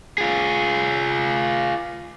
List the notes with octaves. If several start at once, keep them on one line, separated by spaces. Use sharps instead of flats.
F4 G#4